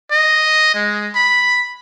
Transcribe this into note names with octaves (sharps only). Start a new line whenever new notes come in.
D#5
G#3
B5